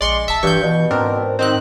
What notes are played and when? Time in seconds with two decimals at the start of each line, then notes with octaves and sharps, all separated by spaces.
0.01 A#1 G#3 D5 C6 C#6
0.28 D#1 E5 A5
0.43 G2 E3 C#6 G6
0.63 B2 E3
0.91 G#2 C4 D4 A#4
1.39 D#3 C4 D#4 F#6